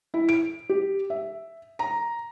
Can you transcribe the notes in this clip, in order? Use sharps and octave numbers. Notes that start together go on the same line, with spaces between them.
E4
D7
G4
E5
A#5